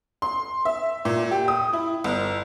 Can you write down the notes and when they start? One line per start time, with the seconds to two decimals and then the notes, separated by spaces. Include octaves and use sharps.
0.22 C6
0.65 E5
1.05 A#2
1.31 G4
1.48 D#6
1.73 E4
2.04 G1